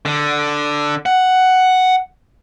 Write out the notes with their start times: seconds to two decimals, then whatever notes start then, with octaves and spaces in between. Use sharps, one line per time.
0.05 D3
1.06 F#5